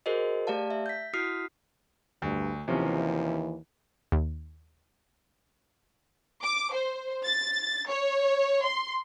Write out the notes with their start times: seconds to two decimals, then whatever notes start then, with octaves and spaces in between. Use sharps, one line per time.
0.06 F#4 G#4 A#4 C5 D#5
0.47 A3 G4 D5 F5 A5
0.70 E5
0.86 G6 B6
1.14 E4 F#4 D#6 F6 B6 C7
2.22 D2 G2
2.68 D#2 C3 E3 F3 C#4
4.12 D#2
6.42 D6
6.73 C5
7.24 A6
7.89 C#5
8.64 C6